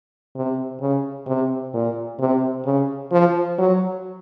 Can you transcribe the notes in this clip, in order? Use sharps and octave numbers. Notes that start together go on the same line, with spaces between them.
C3
C#3
C3
A#2
C3
C#3
F3
F#3